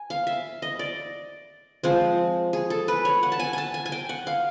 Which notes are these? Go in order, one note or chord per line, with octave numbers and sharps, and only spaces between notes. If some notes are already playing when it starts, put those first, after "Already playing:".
Already playing: G#5
F5
E5
D#5
D5
F3 G#3 C4
G#4
A4
B4
C#5
F#5
A5
G#5
G#5 A5
G#5
G#5
G5
F#5
F5